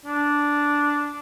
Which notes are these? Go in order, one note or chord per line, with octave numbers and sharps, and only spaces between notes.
D4